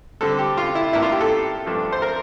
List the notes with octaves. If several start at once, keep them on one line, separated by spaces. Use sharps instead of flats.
D3 G3 C4 A4
G4
F4
E4
A2 E3 A#3 D4 E4
F4
G4
A4
G2 F3 A3 D4
C5
A#4